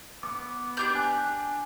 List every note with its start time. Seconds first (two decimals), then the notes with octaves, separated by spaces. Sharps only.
0.23 B3 D6
0.77 D4 G4 G6
0.95 G#5 F#6